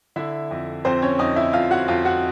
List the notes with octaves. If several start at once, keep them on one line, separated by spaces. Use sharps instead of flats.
D3 E4 E5
F2
F2 C4 C5
C#4 C#5
F2 D#4 D#5
E4 E5
F2 F4 F5
F#4 F#5
F2 F4 F5
F#4 F#5